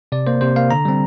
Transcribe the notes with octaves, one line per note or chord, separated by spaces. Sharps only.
C3 D5
A#3 C5
C3 C5
A#3 F5
D3 A#5
G3 C4